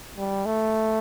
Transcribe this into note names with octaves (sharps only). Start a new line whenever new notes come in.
G3
A3